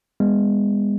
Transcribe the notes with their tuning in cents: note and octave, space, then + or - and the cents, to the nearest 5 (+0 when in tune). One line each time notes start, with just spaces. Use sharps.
G#3 -35 B3 +0